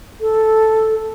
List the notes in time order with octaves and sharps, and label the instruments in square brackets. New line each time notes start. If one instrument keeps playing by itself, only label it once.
[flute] A4